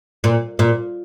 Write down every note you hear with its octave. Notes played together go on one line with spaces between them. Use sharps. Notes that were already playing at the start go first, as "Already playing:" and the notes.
A#2
A#2